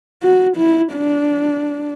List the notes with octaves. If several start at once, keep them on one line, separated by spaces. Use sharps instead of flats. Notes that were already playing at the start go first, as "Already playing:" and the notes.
F#4
E4
D4